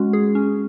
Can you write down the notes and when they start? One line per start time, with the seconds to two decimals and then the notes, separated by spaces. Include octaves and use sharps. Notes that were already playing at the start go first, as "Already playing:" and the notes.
Already playing: G#3 C#4 F#4
0.13 G#4
0.35 C#4